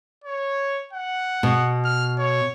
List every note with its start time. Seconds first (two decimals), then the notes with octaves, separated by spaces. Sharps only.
0.24 C#5
0.93 F#5
1.43 B2
1.84 F6
2.18 C#5